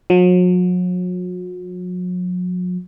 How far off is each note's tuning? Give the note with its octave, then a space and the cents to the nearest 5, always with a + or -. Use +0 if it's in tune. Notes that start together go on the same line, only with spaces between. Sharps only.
F#3 -40